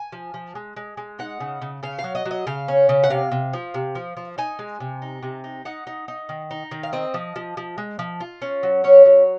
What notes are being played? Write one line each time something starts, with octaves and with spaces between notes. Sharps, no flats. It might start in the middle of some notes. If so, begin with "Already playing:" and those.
Already playing: G#5
F3
F3
G#3
G#3
G#3
D#4 F#5
C#3
C#3
C#3 F5
F5
F#3
D#5
F#3
D#5
C#3 F5
C#4
C#3
F#5
C3 F5
C3
F3
C3
F3
F3
D#4 G#5
G#3
C3
D#4
C3
D#4
D#4 F#5
D#4
D#4
D#3
D#4
D#3
F5
C4 D#5
F3
F3
F3
G#3
F3
F4
C#4
F#3
C#4 C#5
F#3